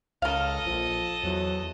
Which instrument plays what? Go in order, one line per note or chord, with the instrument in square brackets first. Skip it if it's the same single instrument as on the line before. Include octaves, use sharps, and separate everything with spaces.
[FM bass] C#2 [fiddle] A4 D#5 [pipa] A#4 F5
[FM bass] A#1 [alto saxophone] F3
[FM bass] E2 [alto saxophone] F#3